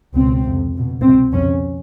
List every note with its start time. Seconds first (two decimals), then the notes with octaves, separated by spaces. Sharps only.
0.14 C#2 B2 C4
0.44 F2 C3
0.73 C#2 B2
1.02 C2 B2 C4
1.32 F2 C#3 C#4